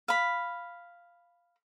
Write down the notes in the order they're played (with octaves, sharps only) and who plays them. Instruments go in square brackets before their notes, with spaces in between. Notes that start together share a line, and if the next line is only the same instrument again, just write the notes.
[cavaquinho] F5 B5